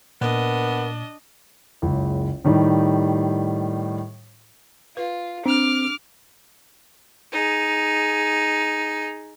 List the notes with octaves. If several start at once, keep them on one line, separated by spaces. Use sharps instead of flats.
A#2 B3 D4 A#4 D#5
F#1 C#2
A2 D#3 G3 D#4 G4
F4 B4
C4 D4 D6 F6
D#4 G#4